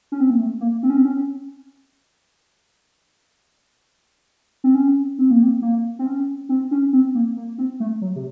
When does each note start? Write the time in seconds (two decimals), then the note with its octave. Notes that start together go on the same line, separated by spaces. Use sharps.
0.12 C#4
0.20 C4
0.30 A#3
0.39 A3
0.61 A#3
0.83 C4
0.90 C#4
0.97 C4
1.05 C#4
4.64 C4
4.75 C#4
5.19 C4
5.31 A#3
5.43 C4
5.62 A#3
5.99 C4
6.06 C#4
6.49 C4
6.71 C#4
6.93 C4
7.15 A#3
7.37 A#3
7.58 C4
7.80 A3
8.01 F#3
8.16 C3